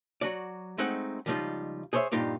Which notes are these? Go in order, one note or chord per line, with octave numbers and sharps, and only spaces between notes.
F#3 F#4 D5
G#3 A3 C4 D#4 F#5
C#2 F3 G3 D#4 F4
G#4 C5 C#5 D#5 E5
G2 A#2 D#4 F4 G4